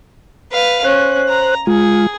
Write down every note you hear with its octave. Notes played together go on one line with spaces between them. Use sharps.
B4 F5
C#4 C5 F#6
A#5
G#3 F4 G#4